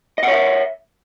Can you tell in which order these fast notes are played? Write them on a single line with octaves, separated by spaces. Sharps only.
D#5 F#5 C#5 E5